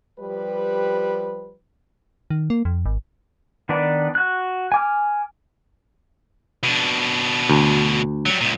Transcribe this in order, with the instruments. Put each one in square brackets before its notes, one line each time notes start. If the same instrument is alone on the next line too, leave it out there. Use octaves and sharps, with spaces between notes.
[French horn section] F3 G3 G4 B4
[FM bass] D#3
A#3
F2
G#1
[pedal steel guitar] D#3 B3 D4 B4 D5
F#4 F#6
G#5 D6 F6
[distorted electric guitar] B2 D4
[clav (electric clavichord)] D2
[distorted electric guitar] F#3 G3
C#2 A#2